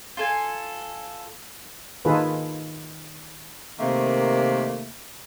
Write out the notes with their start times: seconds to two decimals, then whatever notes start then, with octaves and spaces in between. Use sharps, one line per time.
0.17 F4 A4 G#5
2.05 D#3 D#4 F4 G#4 A4 B4
3.78 C3 D#3 A3 A#3